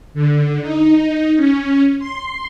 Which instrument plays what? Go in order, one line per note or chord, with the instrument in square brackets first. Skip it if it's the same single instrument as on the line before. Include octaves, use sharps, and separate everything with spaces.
[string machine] D3
D#4
C#4
C6